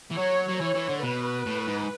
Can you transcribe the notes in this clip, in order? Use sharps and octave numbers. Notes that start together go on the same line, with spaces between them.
E3
F#3 C#5
F#3
E3 C#5
E3
D3
B2 B4
A2
G#2